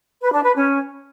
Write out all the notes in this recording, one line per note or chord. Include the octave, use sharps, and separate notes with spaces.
B4
D4
B4
C#4